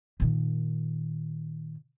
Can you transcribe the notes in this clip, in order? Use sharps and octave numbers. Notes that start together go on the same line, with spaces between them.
A#2 D#3